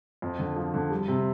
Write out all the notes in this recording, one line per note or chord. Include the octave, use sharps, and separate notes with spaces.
F2
D3
F3
D3
G3
C3